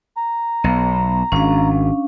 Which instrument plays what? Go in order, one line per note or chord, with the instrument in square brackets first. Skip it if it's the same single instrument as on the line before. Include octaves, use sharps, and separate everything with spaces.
[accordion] A#5
[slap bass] B1 [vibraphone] B3
[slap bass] G#1 [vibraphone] C#4 D4 F5